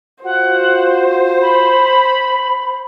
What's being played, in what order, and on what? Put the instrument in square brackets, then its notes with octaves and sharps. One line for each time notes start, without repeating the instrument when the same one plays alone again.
[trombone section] F4 F#4 [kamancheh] C5 [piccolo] F#5
[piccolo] B5